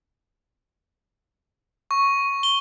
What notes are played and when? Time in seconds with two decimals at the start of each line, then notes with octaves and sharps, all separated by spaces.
1.91 C#6
2.43 G7